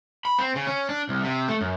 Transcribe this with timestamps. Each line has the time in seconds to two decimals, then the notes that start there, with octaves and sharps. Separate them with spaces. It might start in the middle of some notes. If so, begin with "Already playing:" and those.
0.25 B5
0.39 C4
0.55 C#3
0.67 C#4
0.89 D4
1.09 C2
1.23 C3
1.48 A3
1.61 F#2